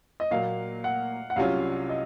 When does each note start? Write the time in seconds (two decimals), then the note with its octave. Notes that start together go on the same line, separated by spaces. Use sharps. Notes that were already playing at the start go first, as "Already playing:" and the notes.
0.20 D#5
0.31 A#2 F#3 A#3 F5
0.84 F#5
1.30 F#5
1.36 C2 C3 F#3 C#4 F4 F5
1.89 D#5